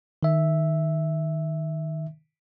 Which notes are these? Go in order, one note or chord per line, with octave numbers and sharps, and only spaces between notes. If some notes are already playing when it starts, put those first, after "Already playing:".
D#3 E5